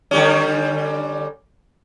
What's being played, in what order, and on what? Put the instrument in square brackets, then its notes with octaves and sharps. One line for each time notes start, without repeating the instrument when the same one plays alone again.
[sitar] D3 G3 C#4